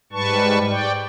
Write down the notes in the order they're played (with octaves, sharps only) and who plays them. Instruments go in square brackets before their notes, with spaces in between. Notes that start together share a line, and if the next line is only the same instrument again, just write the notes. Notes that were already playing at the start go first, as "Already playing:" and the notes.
[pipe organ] G#2 G3 B4 A5 C#6
D5 G5